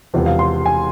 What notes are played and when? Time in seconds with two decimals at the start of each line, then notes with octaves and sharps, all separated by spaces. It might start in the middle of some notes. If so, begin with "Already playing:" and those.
0.14 E1 E2 C3 F3
0.26 F5
0.39 C6
0.66 G#5